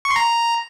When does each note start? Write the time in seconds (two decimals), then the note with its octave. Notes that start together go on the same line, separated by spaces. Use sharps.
0.05 C#6
0.10 C6
0.16 A#5